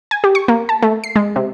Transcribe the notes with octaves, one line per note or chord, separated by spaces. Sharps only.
G#5
G4
C#6
A#3
A5
A3
C7
G#3
C3